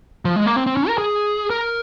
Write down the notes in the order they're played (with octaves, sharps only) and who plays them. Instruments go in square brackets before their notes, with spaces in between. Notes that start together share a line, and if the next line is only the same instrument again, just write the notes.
[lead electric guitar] F3
G#3
A#3
C4
C4
C#4
A#4
G#4
A#4